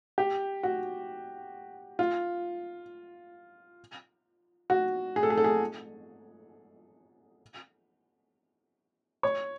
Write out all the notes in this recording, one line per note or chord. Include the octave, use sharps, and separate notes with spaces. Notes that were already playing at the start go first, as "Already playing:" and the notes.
G4
F#4
F4
F#4
G#4
A4
G#4
A4
G#4
C#5